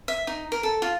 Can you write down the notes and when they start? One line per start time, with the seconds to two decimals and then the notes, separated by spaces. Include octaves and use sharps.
0.08 E5
0.27 D#4
0.52 A#4
0.63 A4
0.82 F4